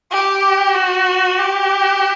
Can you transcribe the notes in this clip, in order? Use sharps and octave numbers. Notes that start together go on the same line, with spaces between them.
G4
F#4
G4